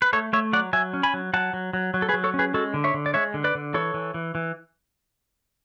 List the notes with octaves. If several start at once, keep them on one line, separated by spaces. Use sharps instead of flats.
B4
A3 A4 C#5
A3 C#5 E5
F#3 D5 F#5
F#3 E5 G#5
C#4
G#5 B5
F#3
F#3 F#5 A5
F#3
F#3
F#3
A4
G#4 B4
F#3
A4 C#5
C#4
G#4 B4
G#3 F#4 A4
D3
C#5 E5
D3
D5
G#3 C#5 E5
D3
B4 D5
D3
E3 A4 C#5
E3
E3
E3